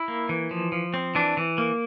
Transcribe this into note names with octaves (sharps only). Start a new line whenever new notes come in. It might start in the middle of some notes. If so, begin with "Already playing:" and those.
Already playing: E4
A#3
E3
F3
F3
C4
E3 D4
E3
A#3